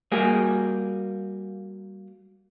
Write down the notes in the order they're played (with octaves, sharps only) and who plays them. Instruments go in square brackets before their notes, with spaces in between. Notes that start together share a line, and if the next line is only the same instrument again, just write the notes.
[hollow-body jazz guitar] G3 A#3 F#4 G#4